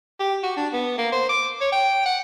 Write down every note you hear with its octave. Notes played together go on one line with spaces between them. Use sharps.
G4
F#4
D4
B3
A#3
C5
D6
C#5
G5
F#5